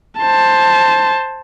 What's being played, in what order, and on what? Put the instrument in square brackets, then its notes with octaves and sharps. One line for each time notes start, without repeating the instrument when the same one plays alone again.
[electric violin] C5 A5